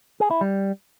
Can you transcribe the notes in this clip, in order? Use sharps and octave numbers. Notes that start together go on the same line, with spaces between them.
G#4
E4
G3